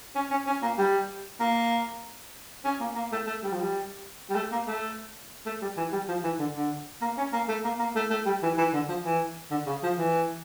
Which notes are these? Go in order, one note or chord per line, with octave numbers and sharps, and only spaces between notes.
C#4
C#4
C#4
A#3
G3
A#3
C#4
A#3
A#3
A3
A3
G3
F3
G3
G3
A3
A#3
A3
A3
G3
E3
G3
F3
E3
D3
D3
A#3
C#4
A#3
A3
A#3
A#3
A3
A3
G3
E3
E3
D3
F3
E3
D3
C#3
F3
E3